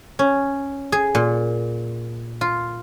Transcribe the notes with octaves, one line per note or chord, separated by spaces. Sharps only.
C#4
G#4
A#2
F4